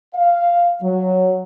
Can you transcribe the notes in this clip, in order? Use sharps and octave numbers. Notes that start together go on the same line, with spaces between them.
F5
F#3